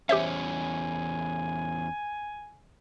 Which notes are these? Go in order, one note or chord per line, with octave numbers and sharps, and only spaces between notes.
E2 C#4 G4 C5 E5 G#5